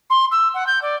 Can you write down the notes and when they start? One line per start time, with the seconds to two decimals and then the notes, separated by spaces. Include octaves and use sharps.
0.10 C6
0.32 E6
0.54 F#5
0.67 G6
0.82 D5